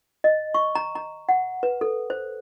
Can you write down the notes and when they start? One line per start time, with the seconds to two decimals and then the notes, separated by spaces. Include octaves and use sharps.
0.24 D#5
0.54 C#6
0.75 A#5
0.95 A#5
1.29 F#5
1.63 B4
1.81 A4
2.10 C5